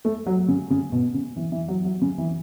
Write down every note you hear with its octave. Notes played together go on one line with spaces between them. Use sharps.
A3
F#3
C#3
C#3
B2
C#3
E3
E3
F#3
F#3
C#3
E3